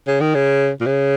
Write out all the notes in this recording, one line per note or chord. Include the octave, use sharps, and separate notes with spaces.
C#3
D#3
C#3
A#2
C#3